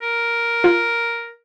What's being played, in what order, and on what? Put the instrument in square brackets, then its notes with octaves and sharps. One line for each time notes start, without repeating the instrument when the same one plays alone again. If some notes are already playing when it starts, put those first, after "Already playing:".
[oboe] A#4
[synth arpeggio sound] F4